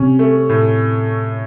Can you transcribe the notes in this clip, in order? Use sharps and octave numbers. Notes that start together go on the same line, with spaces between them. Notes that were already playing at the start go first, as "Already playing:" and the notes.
Already playing: C3 C#4
A3
A2